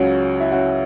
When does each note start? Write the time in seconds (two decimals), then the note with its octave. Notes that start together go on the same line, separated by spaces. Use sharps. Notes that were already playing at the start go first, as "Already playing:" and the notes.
Already playing: C#2 C#3 F#3 C#4 F#4
0.40 E4
0.52 C#4 F#4